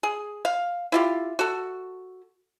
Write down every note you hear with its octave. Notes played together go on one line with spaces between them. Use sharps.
G#4
F5
E4 F4 G4
F#4 A4